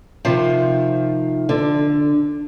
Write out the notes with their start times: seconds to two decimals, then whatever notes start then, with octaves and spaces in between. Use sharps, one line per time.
0.25 C3 D#3 F3
1.49 D3